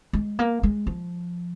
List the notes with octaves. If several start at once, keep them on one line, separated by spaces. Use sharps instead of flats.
G#3
A#3
G#3
F3